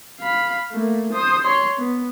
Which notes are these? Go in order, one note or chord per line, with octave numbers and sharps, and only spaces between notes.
F5 B5
A3 A#3
C5 D#6
C#5 C6
B3